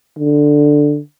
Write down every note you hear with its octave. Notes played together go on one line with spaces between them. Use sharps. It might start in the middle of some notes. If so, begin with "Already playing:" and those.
D3